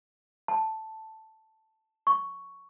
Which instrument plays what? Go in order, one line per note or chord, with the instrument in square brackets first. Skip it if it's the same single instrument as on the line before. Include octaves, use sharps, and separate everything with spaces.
[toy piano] A5
C#6